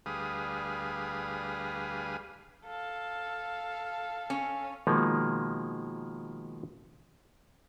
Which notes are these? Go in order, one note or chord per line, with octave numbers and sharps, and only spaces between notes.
D2 G3 G#4 B4 F5 D#6
A4 F5
C#4
B2 D#3 F3 G#3 A#3